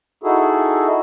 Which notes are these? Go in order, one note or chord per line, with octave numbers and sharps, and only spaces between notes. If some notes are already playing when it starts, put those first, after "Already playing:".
D#4 E4 F#4 G#4 A4